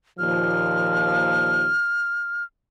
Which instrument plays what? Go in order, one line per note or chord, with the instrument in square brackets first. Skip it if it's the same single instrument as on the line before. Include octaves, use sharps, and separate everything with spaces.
[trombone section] D#2 A#2 F3 [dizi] F6